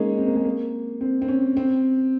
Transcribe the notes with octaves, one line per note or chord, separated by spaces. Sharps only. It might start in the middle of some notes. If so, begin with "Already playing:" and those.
Already playing: G#3 A#3 C#4 D#4
C4
A#3
G#3
A#3
C4
C4
C#4
C4